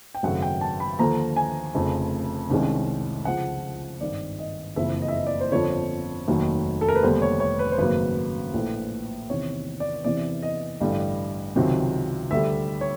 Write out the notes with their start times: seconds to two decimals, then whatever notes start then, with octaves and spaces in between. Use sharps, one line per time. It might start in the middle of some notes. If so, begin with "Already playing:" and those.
0.15 G5
0.23 G#1 F#2 C#3 F#3 A3 F#5
0.42 G5
0.61 A5
0.80 B5
0.99 D#2 D3 F3 A#5
1.36 G#5
1.75 F1 F2 C#3
2.50 C2 C3 D#3 G#3 C#4
3.25 C#2 C#3 F3 F#5
4.01 G#1 G2 D#3 D5
4.39 D#5
4.76 F#1 F2 C#3 E3 E5
5.02 D#5
5.08 E5
5.17 D#5
5.27 D5
5.41 C5
5.52 G1 F2 D3 F3 C#5
6.28 F1 D#2 D#3 F#3
6.81 A4
6.89 A#4
6.95 B4
7.03 F1 D#2 D3 G3 B3 C5
7.22 C#5
7.40 C#5
7.59 B4
7.72 C5
7.78 G#1 F#2 C#3 F#3 A#3 B4
8.54 A#1 A2 F3
9.30 E2 C3 D#3 C#5
9.80 D5
10.05 E2 C3 E3 D5
10.43 D#5
10.80 A1 G2 D3 G3
11.56 C#2 C3 D#3 F#3
12.31 D2 D3 G3 E5
12.81 C#5